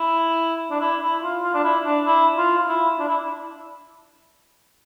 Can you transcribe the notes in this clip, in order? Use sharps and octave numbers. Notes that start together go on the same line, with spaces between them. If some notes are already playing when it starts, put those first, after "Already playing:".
Already playing: E4
D4
E4
E4
F4
F4
D4
E4
D4
E4
F4
F4
E4
D4
E4